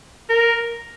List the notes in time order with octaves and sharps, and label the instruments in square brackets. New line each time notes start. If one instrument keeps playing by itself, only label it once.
[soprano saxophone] A#4